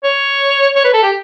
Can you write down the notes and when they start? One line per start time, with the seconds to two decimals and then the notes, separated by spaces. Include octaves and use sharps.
0.04 C#5
0.76 C#5
0.84 B4
0.94 A4
1.03 G4